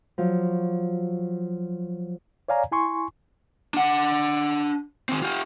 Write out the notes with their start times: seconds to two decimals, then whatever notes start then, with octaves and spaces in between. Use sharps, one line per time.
0.18 F3 F#3
2.48 C#5 D5 F5 G#5 A#5
2.72 E4 G#5 C6 C#6
3.74 D4 F#5
5.09 D#3 C4
5.22 F4 G4